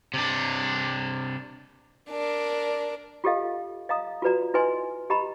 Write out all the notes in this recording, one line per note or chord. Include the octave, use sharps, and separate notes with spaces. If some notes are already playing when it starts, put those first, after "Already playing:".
C3 D4
D4 A#4
F4 G4 A4 D#5 F5
D#5 F5 A#5 D#6
F4 F#4 B4 D5 A#5
E4 B4 D#5 G#5 C6
G4 D#5 A#5 B5